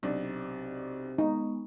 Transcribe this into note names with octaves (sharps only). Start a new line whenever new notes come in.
B1 C3 D4
G#3 B3 D#4 C#6